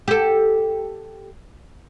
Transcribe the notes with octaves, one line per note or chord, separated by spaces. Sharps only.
G4 A4